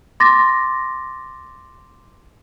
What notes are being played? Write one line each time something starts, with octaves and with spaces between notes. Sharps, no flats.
C6 D6 A6 A#6